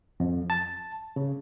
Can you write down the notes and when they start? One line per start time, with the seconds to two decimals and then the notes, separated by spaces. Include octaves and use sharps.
0.20 F2
0.50 A5
1.16 C#3